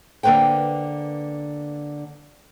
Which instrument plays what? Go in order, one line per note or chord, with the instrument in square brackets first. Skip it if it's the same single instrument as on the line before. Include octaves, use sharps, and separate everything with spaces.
[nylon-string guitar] D3 A#3 B4 C5 G5